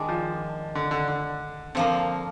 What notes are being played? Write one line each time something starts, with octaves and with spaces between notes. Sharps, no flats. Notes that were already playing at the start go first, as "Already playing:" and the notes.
Already playing: D#3 G#3 D4
F3
D3
D3
D3
D3 F3 A#3 C4